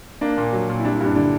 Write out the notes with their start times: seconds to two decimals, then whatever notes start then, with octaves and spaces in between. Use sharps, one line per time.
0.21 A#3 D4
0.37 A#2
0.53 F#3
0.69 A#2
0.79 E4
0.84 G3 D4
0.95 E4
1.00 G2
1.06 D4
1.16 D3 D4